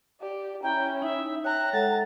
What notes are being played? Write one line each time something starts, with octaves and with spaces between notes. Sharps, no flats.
G4 D5
C#4 E4 G5 A#5
D#4 E5
C#5 E5 G5 A#5 F#6
G#3 A4 F#5 A6